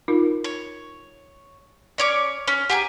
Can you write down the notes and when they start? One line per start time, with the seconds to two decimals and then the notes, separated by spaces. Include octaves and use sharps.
0.08 D#4 F4 A#4
0.44 C#5
1.98 C#4 C#5 D5 D6
2.48 C#4
2.70 G4 G#4 F#5 G#5 A#5